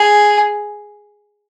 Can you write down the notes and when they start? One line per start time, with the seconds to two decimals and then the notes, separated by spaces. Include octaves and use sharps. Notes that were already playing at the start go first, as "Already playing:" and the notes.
Already playing: G#4